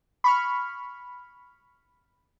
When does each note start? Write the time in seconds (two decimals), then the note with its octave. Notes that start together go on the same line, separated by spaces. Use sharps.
0.24 B5 C#6 F6